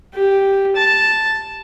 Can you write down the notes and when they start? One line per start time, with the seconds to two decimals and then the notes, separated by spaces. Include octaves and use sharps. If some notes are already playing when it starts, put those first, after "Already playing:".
0.14 G4
0.76 A5